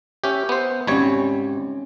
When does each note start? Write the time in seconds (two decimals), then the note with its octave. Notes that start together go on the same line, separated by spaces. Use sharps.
0.24 C#4 G4 E5
0.49 B3 C5
0.87 G#1 G3 C4 C#4 C#5